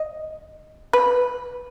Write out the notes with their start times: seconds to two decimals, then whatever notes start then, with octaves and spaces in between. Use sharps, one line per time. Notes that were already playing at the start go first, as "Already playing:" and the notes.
Already playing: D#5
0.93 B4